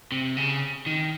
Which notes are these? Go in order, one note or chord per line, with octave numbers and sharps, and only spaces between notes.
C3
C#3
D#3